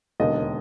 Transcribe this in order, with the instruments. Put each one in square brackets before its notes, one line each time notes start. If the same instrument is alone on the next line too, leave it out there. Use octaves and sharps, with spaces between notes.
[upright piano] E1 D#2 D3 D#5